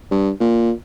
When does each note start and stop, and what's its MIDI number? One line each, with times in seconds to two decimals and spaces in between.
0.11 0.30 43
0.40 0.71 46